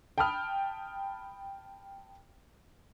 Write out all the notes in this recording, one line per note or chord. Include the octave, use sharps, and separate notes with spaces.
G5 A5 B5 D#6 F6